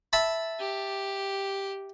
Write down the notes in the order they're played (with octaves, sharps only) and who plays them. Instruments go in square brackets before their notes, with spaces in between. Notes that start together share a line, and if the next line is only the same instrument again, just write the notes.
[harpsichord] E5 A5 B5
[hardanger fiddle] G4